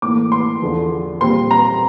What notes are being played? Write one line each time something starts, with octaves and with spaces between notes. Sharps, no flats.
A2 E3 A#3 D6
C6
E2 D3 F3
A#2 G3 C4 C6
A#5